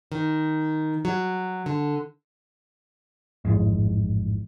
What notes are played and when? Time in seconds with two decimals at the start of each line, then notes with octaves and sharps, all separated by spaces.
0.12 D#3
1.05 F#3
1.66 D3
3.45 A1 F2 G#2